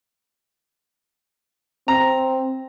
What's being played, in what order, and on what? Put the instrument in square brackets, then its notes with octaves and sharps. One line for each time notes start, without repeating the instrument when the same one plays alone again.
[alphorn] C4 [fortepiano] A#5